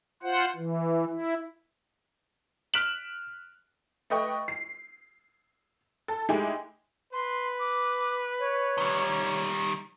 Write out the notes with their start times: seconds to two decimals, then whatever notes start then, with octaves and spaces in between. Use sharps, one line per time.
0.23 F4 C5 F#5
0.56 E3
1.10 E4
2.74 F6 F#6 B6 D7 E7 F#7
4.10 A3 B4 D#5 G5 C#6
4.48 C7
6.08 A4
6.29 G#3 A3 D#4 E4 G4 G#4
7.13 B4 C6
7.59 D6
8.39 C#5
8.78 D#3 G3